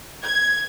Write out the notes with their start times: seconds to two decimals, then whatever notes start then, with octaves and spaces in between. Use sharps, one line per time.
0.24 G#6